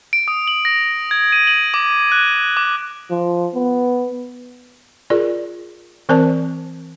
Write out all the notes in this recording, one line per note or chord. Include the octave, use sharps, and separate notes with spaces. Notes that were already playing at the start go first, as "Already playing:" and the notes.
D7
D#6
F#7
A#6
G#6
D#7
F#7
D6
F#6
D6
F3
B3
F4 G#4 A#4 D5
E3 C4 A#4 C5 D5 A5